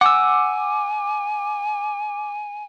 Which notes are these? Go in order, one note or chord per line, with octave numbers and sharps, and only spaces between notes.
F#5 G#5 D6 E6